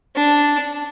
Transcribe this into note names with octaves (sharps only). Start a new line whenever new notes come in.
D4